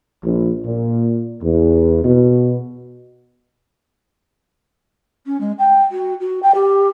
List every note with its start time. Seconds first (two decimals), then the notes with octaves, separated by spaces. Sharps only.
0.24 A#1
0.65 A#2
1.43 E2
2.05 B2
5.26 C#4
5.40 G#3
5.58 G5
5.91 F#4
6.20 F#4
6.42 G5
6.54 G4